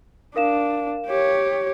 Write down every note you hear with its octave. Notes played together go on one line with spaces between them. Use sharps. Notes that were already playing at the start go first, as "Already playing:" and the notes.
D4 A#4 F5 E7
G4 C#5